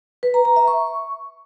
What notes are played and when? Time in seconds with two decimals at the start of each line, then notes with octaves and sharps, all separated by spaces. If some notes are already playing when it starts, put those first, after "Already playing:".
0.23 B4
0.34 A#5
0.45 A#5
0.56 E5
0.67 C#6